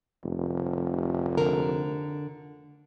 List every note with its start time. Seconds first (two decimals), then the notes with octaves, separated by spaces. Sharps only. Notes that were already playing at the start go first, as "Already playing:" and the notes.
0.24 F1
1.37 D3 A#4